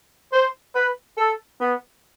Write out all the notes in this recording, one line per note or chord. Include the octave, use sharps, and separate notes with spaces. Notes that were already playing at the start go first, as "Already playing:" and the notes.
C5
B4
A4
B3